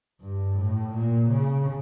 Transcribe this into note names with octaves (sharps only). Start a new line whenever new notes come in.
G2
A2
A#2
C#3